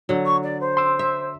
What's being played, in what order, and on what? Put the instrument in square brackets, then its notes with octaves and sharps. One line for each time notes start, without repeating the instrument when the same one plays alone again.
[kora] D3 F#3
[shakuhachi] C#6
D5
C5
[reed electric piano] C6 E6
[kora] E5